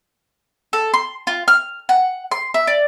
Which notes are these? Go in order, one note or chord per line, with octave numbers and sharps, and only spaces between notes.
A4
C6
F4
F6
F#5
C6
E5
D5